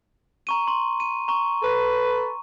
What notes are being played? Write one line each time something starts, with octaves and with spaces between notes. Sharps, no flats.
A#5 C#6 D#7
C6
D#7
A#5 C#6
A4 B4